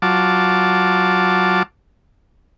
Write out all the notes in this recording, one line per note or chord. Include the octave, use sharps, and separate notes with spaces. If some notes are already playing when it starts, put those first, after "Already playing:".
F#3 F4 A5 D6